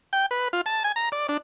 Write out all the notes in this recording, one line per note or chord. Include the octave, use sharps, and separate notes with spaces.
G5
B4
F4
A5
G#5
A#5
D5
D4